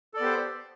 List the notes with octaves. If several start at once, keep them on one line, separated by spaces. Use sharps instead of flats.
B3 G4 A4 C5 D5